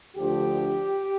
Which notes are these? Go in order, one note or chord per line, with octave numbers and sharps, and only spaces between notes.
D2 D3 F3 A3 G4